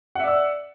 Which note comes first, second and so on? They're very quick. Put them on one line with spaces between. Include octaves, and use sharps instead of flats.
F#5 E5 D5 E6